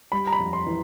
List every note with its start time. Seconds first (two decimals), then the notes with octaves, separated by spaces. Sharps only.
0.12 G3 B5
0.27 A#5
0.32 B5
0.39 F2
0.53 C6
0.66 E3